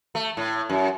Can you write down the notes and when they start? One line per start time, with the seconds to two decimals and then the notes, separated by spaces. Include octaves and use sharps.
0.15 A3
0.37 A2
0.69 F#2